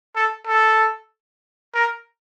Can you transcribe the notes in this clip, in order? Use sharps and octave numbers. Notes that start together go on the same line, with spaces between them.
A4
A4
A#4